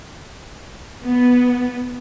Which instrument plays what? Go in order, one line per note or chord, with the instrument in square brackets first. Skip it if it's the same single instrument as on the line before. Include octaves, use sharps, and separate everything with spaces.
[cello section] B3